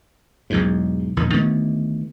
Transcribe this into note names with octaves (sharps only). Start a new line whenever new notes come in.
B1 E2 G#2
A#1 E2 A#2 D#3
D2 D#3 A3 B3